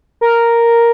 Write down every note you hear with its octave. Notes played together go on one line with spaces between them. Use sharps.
A#4